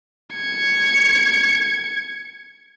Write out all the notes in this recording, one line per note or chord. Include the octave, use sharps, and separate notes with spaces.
G#6 C#7